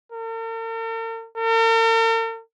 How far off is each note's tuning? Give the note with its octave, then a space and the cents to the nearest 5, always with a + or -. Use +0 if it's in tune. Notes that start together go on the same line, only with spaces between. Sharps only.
A#4 -45
A#4 -45